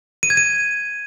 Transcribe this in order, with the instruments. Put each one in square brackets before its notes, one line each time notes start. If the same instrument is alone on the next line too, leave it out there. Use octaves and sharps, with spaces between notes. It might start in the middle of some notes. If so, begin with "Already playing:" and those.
[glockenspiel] D#7
G#6
D#7